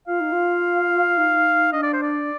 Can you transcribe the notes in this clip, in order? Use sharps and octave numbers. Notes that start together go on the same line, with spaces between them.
F4 F5
D#4
F4
D#4
D4 D#5
D5
C5
D5